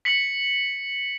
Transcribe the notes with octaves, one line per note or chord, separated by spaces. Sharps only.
B6 C#7 F#7